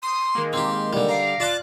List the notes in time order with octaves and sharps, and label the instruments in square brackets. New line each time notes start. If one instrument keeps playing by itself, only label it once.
[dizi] C6 [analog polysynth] D#6
[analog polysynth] D#3 G#3 A#3
[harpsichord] C4 G4 [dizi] C6
[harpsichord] D3 G3
[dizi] F5 [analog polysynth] A#5 D6
[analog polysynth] F4 F#6 [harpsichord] D5 A5 D6